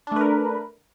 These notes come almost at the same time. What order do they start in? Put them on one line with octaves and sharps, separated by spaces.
D4 A3 B4 A#4